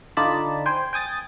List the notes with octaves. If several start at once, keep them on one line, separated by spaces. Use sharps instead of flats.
D3 D#4 F4 D5 A5 B5
C5 G5 G#5
G5 G#5 D#6 A6